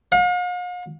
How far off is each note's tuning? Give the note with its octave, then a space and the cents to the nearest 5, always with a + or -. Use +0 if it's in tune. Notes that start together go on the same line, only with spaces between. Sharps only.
F5 +45